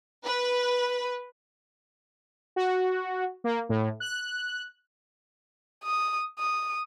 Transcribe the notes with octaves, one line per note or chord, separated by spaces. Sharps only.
B4
F#4
A#3
A2
F#6
D#6
D#6